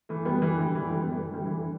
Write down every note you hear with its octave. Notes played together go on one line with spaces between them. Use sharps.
E3 A3
G3 B3
E3 A3
D3 G3
E3
D3 G3
G3 B3
E3 A3
E3
D3 G3
E3
D3